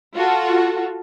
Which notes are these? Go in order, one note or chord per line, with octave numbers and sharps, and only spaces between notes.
F4 F#4 A4